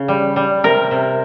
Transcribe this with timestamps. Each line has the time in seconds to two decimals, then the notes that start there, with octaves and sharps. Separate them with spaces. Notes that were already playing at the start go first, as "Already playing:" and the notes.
Already playing: C#3
0.08 G3
0.36 G3
0.64 C3 A#4
0.91 C3